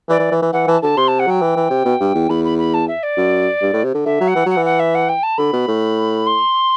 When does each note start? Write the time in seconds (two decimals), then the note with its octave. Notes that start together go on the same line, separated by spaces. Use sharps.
0.09 E3 D5
0.20 E3
0.31 E3
0.42 E3
0.52 E3 F#5
0.67 E3 A5
0.82 D3 A5
0.97 C3 C6
1.07 A5
1.19 F#5
1.27 F#3 G5
1.42 E3
1.56 E3
1.70 C3
1.85 B2
2.00 G2
2.15 E2
2.29 E2 B5
2.44 B5
2.58 B5
2.74 A5
2.87 E5
3.03 D5
3.17 F#2
3.62 G2
3.73 A2
3.84 C3
3.94 D3
4.05 D3 E5
4.21 F#3
4.27 F#5
4.35 E3
4.46 F#3 F#5
4.57 E3
4.65 F#5
4.79 E5
4.94 F#5
5.08 G5
5.23 A5
5.38 D3 B5
5.53 B2
5.68 A2
6.26 C6